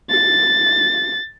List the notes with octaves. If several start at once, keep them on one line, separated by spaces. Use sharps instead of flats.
A6